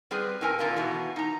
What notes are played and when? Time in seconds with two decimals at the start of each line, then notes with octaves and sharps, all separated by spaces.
0.11 G3 C4 G#4 B4
0.41 A2 C4 A#4 G#5
0.59 A#2 D3 A3 A#3
0.76 B2 E3
1.16 D#4 A#5